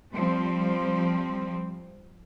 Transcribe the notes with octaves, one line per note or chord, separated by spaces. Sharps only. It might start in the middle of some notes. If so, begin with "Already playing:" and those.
F3 G3 C4